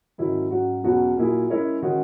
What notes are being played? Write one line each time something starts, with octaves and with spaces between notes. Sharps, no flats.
G#2 D#3 F#3 C#4 E4
G#2 F#3 C#4 F#4
E2 B2 F#3 C#4 F#4
A#2 F#3 A#3 E4 G#4
G#3 C#4 E4 A#4 C#5
D#3 G#3 C#4 F#4